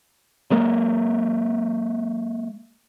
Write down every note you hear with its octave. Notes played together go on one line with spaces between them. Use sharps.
F#3 G#3 A#3